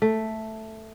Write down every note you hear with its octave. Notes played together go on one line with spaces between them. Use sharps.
A3